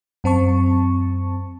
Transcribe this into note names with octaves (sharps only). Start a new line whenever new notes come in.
F#2 C4 A5 C#6